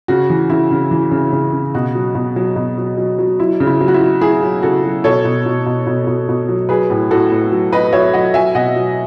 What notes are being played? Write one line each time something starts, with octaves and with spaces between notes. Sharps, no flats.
C#3 F#4
E3
C#3 E4
C#3
E3
C#3
C#3
C#3
B2 F#4
F#3
B2
F#3
B2
F#3
F#3
F#3
F#3 E4
C#3
E4
F#3
F#4
E4
F#3
F#3 E4 G#4
F#3
C#3 F#4 A4
F#3
B2 A4 C#5
B2
B2
B2
B2
B2
B2
F#3
F#3 G#4 B4
A2
A2 F#4 A4
A2
F#3
F#3 B4 D#5
F#3 C#5 E5
F#3 D#5 F#5
F#3 E5 G#5
B2 D#5 F#5
F#3